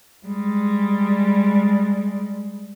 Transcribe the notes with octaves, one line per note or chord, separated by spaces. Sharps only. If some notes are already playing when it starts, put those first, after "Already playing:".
G3 G#3